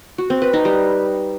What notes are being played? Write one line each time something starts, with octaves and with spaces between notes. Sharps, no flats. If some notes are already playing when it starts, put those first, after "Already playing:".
F#4
C4
B4
D#4
G3